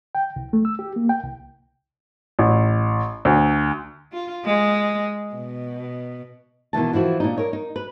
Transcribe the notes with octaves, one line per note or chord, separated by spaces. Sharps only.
G5
C2
A3
E6
G4
A#3
G5
C2
A1
D2
F4
G#3
B2
B2 D#3 E3 A5
E3 F3 E4 F#4
A#2 D4 D#4
A#4 C#5
D#4
B4